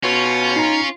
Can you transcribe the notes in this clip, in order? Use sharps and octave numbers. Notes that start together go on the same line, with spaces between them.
B2 C#4 F4
D#4 A#5